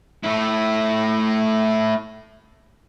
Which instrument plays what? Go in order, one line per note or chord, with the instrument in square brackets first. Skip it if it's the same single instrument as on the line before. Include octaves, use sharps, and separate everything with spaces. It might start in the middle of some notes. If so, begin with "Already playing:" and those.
[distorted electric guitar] A3 E4